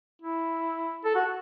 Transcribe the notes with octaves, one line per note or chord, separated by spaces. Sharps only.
E4
A4
F#4